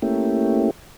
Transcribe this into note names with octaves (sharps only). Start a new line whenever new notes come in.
A3 A#3 C#4 E4 G4